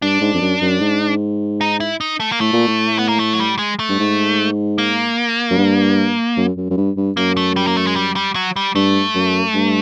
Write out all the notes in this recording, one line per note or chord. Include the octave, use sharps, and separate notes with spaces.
G2 D4
G#2
F2
F#2
F#2
G#2
D#4
E4
D#4
A3
A#3
A2 A3
A#2
A2
B3
A#3
A3
F#3
G3
G#3
A3
G2
G#2
A#3
F#2
G2
F#2
F#2
F#2
G2
G2
F#2 A#3
A3
G3
A#3
A3
G#3
G3
G3
F#3
G3
G2 A3
F#2
G2